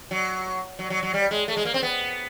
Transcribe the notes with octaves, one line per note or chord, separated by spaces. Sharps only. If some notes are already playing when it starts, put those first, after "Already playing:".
F#3
F#3
F#3
F#3
G3
G#3
A3
G#3
A#3
C4
B3